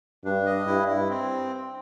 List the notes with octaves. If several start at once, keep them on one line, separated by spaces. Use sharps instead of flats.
G2 D4
D#5
G2 E4
E4
C4